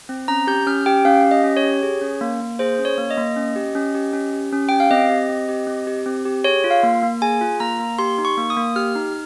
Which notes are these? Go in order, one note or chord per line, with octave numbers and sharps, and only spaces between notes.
C4
C#4 A#5
G4 G6
C#4 F6
G4 G5
C#4 F5
G4
D#5
C#4
C#5
G4
G#4
C#4
A#3
A#3
G#4 C5
C#4
C#5
A#3
D#5
A#3
C#4
G4
C#4
G4
C#4
G4
C#4
G4 G5
F5
C4 D#5
G4
C4
G4
C4
G4
C4
G4
G#4 C#5
F4
F5
A#3
A#3
G#4 G#5
F4
A#3 A#5
A#3
G4 C6
D#4
C#6
A#3
D#6
A#3
G4 F6
D#4